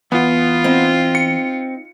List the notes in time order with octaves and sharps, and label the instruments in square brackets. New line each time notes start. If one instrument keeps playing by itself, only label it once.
[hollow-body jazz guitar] E2 [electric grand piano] B3 [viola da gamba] F4
[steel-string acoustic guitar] C4 D#4
[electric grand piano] C#7